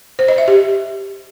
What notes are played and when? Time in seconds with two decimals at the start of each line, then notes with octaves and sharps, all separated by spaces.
0.19 C5
0.28 D#5
0.38 E5
0.48 G4